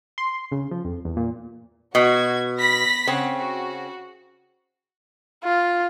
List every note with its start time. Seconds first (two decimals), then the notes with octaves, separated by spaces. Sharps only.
0.18 C6
0.52 C#3
0.71 F3
0.85 F2
1.05 E2
1.17 A#2
1.95 B2 F#4 G#6
2.59 B5 A#6 B6
3.07 C#3 C4 F#5
3.36 F#4
5.44 F4